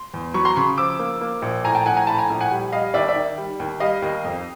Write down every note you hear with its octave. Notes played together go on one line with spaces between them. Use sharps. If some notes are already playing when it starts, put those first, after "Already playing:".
Already playing: C6
E2
F#3 B5 C#6
A#5 C6
C#3 B5 C#6
F3 D6 E6
A#3
A#3
A#1
A2 G#5 A#5
G5 A5
A#1 F#5 G#5
G#5 A#5
A2 A5 B5
G#5 A#5
A#1
F#5 G#5
G3
G3 D#5 F5
D#2 D5 E5
D5 E5
D#3
G3
D#2
G3 D#5 F5
D#2
F2